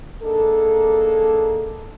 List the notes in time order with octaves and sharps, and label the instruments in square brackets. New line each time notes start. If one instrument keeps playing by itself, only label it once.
[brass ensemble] A#3 D4 D#4 G#4 A4